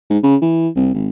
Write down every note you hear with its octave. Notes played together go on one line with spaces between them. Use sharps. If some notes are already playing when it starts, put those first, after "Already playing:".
G#2
C#3
E3
C2
G#1